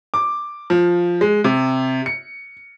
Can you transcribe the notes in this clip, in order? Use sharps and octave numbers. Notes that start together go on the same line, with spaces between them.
D6
F3
G#3
C3
C#7